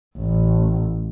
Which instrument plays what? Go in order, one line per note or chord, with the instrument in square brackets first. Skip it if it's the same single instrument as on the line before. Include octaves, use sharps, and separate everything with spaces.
[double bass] A1